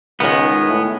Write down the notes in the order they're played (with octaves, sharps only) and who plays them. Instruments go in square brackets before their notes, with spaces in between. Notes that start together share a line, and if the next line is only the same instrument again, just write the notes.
[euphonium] C#2 [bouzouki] D#3 G#3 [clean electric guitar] B3
[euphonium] A2